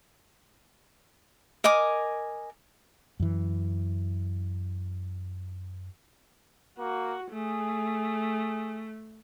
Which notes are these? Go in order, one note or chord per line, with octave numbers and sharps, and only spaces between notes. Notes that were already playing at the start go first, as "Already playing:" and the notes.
A#4 D#5 G#5 D6
F#2 E3
A#3 F#4
A3 G#4